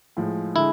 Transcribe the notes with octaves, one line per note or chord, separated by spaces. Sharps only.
A2 F3 G#3
D3 G#3 E4